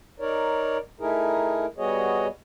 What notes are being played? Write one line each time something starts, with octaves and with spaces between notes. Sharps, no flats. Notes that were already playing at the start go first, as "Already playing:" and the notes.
D#4 A#4 C#5 D5
A3 D#4 E4 G#4 A#4
G3 B3 F#4 G#4 C#5 D#5